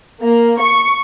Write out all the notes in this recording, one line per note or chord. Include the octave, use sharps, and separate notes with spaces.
A#3
C#6